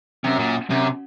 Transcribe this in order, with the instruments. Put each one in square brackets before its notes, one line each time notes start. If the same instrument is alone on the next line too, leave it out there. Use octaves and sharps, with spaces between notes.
[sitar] F#2 [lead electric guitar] C3
[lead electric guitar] A#2
[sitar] F#2 [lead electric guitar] C3